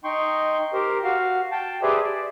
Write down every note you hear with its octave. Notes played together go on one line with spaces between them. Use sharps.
D#4 G5 C6 C#6
G4 A#4 C5
F#4 F5
G5 A5
G4 G#4 B4 C5 D5 E5
D5